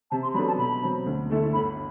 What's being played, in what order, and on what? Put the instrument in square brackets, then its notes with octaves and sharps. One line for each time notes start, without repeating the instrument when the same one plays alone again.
[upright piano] C3 [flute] A5
[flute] C6
[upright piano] F#3 B3 D4 A4 [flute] B5
[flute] A5
[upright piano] B2 [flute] B5
[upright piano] F#3 C4
D2
D3 A3 E4 A4
[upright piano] G1 [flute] B5